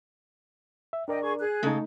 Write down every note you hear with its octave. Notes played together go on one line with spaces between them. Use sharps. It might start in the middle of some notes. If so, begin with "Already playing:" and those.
E5
D4 A#4 D5 D#5 G5
G#4 C#6
G#4 F#6
C#3 G#3 A3 D#4 A4